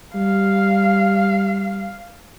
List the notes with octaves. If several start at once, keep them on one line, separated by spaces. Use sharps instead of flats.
G3 F5